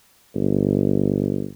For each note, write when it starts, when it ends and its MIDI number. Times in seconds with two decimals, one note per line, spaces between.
0.35 1.49 31